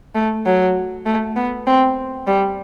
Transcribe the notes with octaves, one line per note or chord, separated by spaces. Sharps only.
A3
F#3
A3
B3
C4
G3